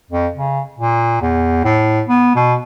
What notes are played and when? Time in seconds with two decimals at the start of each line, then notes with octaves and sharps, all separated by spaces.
0.11 F2
0.35 C#3
0.79 A#2
1.22 E2
1.64 A2
2.09 B3
2.35 B2